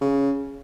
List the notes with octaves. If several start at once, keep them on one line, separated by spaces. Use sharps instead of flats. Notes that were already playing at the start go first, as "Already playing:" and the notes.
C#3